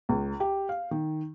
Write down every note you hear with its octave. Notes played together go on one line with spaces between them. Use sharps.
C#2
G4
F5
D#3